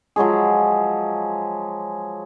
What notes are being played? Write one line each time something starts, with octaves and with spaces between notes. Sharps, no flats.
F3 F#3 G#3 G#4